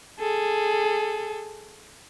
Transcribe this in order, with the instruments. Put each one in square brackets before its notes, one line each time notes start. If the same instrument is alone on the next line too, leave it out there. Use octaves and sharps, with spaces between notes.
[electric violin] G#4 A4